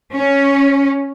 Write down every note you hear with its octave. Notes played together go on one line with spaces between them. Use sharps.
C#4